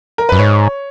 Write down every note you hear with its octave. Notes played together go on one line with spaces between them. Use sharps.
A#4
F#2 B4
G#2 C#5